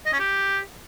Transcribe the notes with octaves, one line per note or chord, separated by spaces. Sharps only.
D#5
C#4
G4